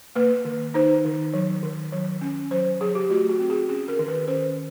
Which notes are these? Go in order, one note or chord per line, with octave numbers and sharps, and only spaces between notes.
A#3 B4
D#3
D#4 C5
D#3
F#3
D#3
F#3
C#4
F#3 C5
F#3 G#4
G4
A3 F#4
F#4
C4
G#4
C#4 G#4
A#4
D#3
B4
C#4 C5